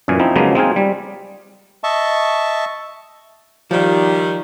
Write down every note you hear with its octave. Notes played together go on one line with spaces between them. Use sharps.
F#2 A#2 E3 G#5
F3 C4 D#4 E4
C#3 F3 F#3 G#3 A#3 B3
G#3 C4 D#4 F4 G#5
G3
D#5 E5 A5 C#6
D#3 F3 G3